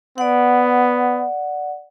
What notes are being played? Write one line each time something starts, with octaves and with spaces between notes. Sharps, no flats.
B3 D5 F#5